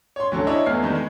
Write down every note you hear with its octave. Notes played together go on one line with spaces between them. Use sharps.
C#5 C6
D2 F#3 C#4 A4
D4 E4 C#5 D#5
E2 A3 B3 E4 F6 C7
D#3 G3 A3 B3 D#4
G#3